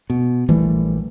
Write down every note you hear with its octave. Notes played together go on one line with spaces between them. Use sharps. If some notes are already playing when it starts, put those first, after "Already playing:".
B2
A#1 E3 G3 A3